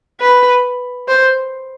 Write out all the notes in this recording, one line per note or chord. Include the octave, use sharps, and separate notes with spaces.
B4
C5